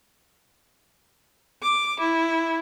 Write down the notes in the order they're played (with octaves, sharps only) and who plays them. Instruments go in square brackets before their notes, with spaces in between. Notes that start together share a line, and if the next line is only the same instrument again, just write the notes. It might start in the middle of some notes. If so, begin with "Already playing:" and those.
[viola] D6
E4